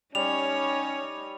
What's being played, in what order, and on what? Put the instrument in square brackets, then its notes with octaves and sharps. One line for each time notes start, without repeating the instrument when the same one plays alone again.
[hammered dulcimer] G3 [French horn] C#4 [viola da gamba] D#4 C#5 [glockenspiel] F7